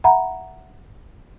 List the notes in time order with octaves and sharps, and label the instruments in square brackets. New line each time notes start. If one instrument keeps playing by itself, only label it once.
[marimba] E5 F#5 A#5 B5